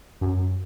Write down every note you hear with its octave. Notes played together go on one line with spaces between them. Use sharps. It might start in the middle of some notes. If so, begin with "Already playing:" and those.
F#2